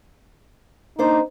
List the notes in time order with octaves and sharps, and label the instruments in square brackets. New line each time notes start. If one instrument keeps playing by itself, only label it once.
[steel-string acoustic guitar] A#3 D4 C5 [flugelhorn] D#4